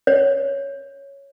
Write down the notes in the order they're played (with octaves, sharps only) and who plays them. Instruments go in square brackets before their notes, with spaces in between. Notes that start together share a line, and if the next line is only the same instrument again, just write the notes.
[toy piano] C#5